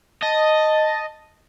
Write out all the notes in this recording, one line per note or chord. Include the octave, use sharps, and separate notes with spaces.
D#5 A5